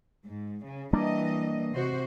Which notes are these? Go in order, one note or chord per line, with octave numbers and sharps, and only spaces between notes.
G#2
C#3
E3 G3 A#3 D4 D#5
C3 F#4 C5